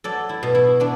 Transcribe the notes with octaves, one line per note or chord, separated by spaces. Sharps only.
F#3 A4 D5
E4
B2
E4
B3 D4